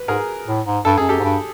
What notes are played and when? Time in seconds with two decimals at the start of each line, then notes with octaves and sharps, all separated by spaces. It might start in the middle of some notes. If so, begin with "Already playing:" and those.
Already playing: B4
0.08 G#2 G#4 A#4
0.47 A2
0.66 G#2
0.85 G2 A4
0.98 F#2 G#4
1.09 F#2 G4 A4
1.19 G#2
1.24 G2